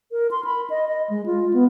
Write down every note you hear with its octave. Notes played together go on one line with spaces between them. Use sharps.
A#4
C6
B5
D#5
D#5
G#3
F4
B3